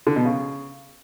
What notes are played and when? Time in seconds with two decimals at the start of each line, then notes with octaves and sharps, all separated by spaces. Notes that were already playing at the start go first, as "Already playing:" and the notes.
0.07 D3
0.16 B2
0.25 C#3